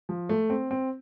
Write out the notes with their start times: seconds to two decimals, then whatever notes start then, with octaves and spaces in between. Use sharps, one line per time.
0.09 F3
0.29 A3
0.50 C4
0.71 C4